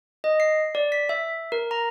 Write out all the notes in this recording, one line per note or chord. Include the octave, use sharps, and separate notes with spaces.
D#5
C7
D5
B6
E5
A#4
A#5